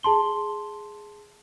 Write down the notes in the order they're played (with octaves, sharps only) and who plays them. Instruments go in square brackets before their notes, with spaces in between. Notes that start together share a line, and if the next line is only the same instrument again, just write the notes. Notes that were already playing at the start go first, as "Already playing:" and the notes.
[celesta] G#4 A5 C6 G7